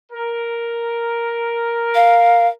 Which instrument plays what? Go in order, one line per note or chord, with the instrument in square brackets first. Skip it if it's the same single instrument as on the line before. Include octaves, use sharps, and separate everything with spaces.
[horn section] A#4
[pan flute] F5